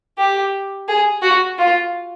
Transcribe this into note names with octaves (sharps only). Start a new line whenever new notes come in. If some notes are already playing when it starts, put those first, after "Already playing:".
G4
G#4
F#4
F4